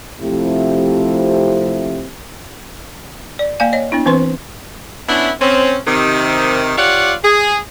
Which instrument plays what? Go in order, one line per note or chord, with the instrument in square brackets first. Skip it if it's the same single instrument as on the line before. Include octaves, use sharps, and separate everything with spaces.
[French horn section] C3 F3 A3 C4 E4 G4
[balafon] D5
A#3 D5 F5 G#5
C#5 D#5
B3 D4 E4
E3 C4 B4 C5 C6
[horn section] B3 C#4 D4 E4
C4 C#4
C3 D#3
F4 G4 C#5 D5 F5 F#5
G#4